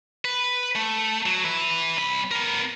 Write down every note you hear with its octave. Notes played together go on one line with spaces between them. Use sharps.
B4
A3
F#3
B4 E5
C2 B5
B3 A#4